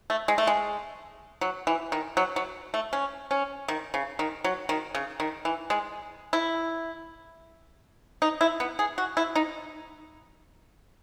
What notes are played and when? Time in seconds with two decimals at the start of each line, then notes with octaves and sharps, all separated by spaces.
0.10 A3
0.28 G#3
0.38 A3
0.47 G#3
1.41 F#3
1.67 E3
1.92 D#3
2.17 F#3
2.36 F#3
2.74 A3
2.93 C#4
3.31 C#4
3.68 D#3
3.94 C#3
4.19 D#3
4.44 F#3
4.69 D#3
4.95 C#3
5.20 D#3
5.45 E3
5.70 G#3
6.33 E4
8.22 D#4
8.41 E4
8.60 B3
8.79 G#4
8.98 F#4
9.17 E4
9.35 D#4